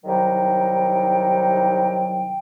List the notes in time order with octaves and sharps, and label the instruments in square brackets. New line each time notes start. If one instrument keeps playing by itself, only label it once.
[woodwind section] C2 D#3 F#3 D#4 G5